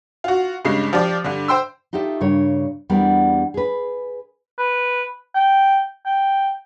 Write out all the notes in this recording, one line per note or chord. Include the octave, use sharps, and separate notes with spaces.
F4 F#4
G2 C#3 G#3 C7
F3 G4 D5
G2 D3
C5 G5 C6 E6
D#4 F4 G4 A4 E5
G2 C#3 A#4 C#5
E2 G3 B3 D4 A#4
G#4 B4
B4
G5
G5